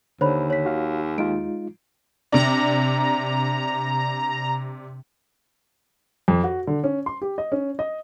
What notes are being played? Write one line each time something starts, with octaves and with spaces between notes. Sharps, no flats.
D#2 D3 C5 C#5 B5
C#5 B6
F#4 F5
G#3 D#4 F4 D7
C3 D4 A#5
F2
F#4
D3
C#4
C6
G4
D#5
C#4
D#5